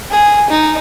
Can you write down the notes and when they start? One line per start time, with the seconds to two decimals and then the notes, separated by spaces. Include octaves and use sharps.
0.11 G#4
0.50 D#4